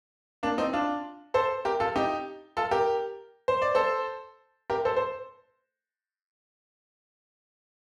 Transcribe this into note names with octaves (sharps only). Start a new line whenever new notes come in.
A#3 D4
C4 D#4
D4 F4
A4 C5
G4 A#4
F4 A4
D#4 G4
F4 A4
G4 A#4
C5
D5
A4 C5
G4 A#4
A4 C5
C5